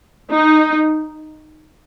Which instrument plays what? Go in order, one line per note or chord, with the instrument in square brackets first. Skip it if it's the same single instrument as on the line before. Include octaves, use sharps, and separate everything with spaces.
[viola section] D#4